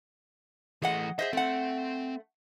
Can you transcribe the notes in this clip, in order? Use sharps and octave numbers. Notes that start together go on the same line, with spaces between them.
E3 A3 G#4 D#5 F#5
G#4 C5 D#5 E5
A3 C4 F#5